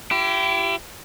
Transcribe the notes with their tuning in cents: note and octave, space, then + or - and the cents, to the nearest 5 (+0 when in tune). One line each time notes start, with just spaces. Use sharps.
E4 +35 G4 -25